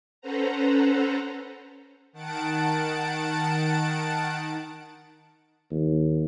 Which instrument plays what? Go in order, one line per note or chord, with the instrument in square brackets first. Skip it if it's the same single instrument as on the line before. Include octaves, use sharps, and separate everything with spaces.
[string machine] C#4 A4 B4 C5 F#5 A#5
[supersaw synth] D#3 F#5 A5 D7
[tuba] D#2